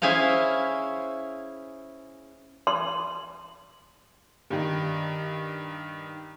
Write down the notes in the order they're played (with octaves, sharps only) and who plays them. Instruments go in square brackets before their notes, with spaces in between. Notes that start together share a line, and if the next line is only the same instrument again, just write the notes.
[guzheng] C#4 E4 G#4 C5 F5
[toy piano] C6
[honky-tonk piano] G2 D#3